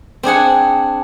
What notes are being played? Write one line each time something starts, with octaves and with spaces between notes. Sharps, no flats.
C4 D4 G#4 F#5